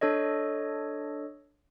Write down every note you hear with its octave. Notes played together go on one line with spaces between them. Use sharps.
D4 A4 C#5 D#5